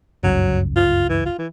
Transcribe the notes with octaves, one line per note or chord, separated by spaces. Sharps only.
G1 C#2 F#2 F#3
F4
E3
F4
E3